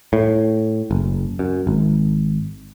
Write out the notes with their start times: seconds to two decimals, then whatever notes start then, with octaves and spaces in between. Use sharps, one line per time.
0.13 A2
0.91 F#1
1.39 F#2
1.67 G#1